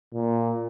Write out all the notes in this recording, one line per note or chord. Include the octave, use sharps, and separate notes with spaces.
A#2